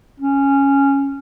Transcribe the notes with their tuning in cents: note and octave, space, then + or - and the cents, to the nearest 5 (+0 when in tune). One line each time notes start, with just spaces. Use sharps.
C#4 -5